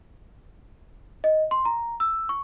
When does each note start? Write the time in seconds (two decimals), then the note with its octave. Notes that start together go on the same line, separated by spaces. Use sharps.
1.24 D#5
1.51 C6
1.65 A#5
2.00 E6
2.29 C#6